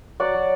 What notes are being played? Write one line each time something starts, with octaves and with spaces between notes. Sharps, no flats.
F#3 D5 F#5
F#3